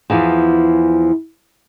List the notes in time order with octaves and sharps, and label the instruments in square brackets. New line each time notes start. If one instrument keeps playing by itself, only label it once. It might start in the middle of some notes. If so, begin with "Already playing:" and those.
[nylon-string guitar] E2 E3 F3